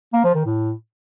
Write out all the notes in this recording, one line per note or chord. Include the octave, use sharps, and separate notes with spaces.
A#3
F3
D#3
A2